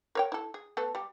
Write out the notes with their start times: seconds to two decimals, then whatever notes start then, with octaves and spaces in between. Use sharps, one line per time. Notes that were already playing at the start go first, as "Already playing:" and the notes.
0.15 A#4 C#5 G5
0.32 E4 A4
0.54 G#4
0.77 A3 B3 A4
0.95 G3 G4